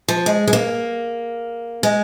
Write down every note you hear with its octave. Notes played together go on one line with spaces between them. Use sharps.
F3
G#3
G#3
A#3
G#3